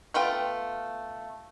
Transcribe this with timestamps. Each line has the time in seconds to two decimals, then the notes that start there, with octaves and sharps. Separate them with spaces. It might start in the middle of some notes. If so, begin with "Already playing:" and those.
0.14 A3 B3 F4 G5